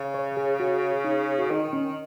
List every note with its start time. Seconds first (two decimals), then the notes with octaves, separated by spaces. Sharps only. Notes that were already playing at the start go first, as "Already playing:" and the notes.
Already playing: C#3
0.14 C#5
0.37 G#4
0.60 F#4
1.05 D#4
1.39 F#4
1.50 D#3 D#4
1.73 C#4